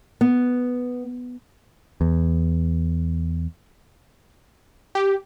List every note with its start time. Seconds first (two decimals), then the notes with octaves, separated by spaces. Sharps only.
0.21 B3
2.01 E2
4.95 G4